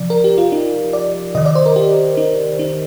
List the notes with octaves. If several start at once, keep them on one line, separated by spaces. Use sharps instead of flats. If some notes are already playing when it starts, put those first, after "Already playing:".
Already playing: C3 F3 D5
A#4
G4
F4
D#4
D5
C3 D#3 D#5
D5
C5
A#4
G4
D#4
D#4